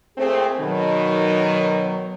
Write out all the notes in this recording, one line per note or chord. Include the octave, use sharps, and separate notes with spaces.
A#2 A3 C4 G#4
B2 D#3 F#3